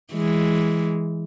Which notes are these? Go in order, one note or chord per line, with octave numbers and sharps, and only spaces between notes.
E3 G#3